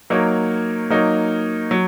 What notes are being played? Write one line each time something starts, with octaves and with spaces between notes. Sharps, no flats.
F#3 A#3 D#4 A#4 C#5
F#3 A#3 D#4 A#4 C#5
F#3